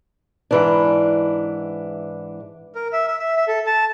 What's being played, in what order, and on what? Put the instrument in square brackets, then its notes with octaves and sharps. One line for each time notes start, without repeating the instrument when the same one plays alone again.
[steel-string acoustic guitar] G#2 E3 D4
[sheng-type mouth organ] A#4
E5
E5
E5
E5
A4
A5